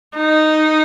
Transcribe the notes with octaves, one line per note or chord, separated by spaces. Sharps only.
D#4